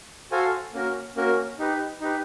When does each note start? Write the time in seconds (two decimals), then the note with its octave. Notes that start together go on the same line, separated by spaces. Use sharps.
0.31 F#4 A4 C5 F5 G#5
0.73 A#3 C#4 F#4 A#4
1.16 A#3 C#4 F#4 A#4
1.59 D#4 G4 B4
2.00 D#4 G4 B4